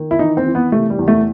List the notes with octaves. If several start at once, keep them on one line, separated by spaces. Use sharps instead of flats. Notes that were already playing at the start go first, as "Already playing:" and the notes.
Already playing: D#3
E4
E3 D#4
C4
E3
B3
C3 A3
G3
E2
A3